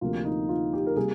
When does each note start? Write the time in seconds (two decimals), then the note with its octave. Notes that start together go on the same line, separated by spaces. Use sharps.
0.01 D2 C3 F3 A#3 F4
0.25 D#4
0.49 F4
0.73 G4
0.86 A#4
0.96 C3 G3 A#3 G#4